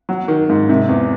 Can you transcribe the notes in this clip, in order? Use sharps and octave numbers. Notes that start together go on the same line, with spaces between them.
F#3
D#3
G#2
C3
E2